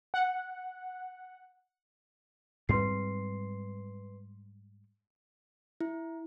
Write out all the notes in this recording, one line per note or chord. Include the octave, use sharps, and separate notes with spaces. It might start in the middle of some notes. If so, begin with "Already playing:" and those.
F#5
G#2 G3 C4 B4 C6 C7
E4